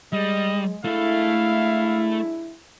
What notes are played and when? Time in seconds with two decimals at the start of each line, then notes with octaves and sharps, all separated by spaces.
0.13 G3 G#3 D#5
0.84 G#3 A3 D4 E4 A4 F5